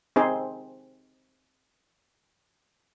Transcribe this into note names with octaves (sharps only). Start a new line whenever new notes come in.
C4 D#4 G#4 C5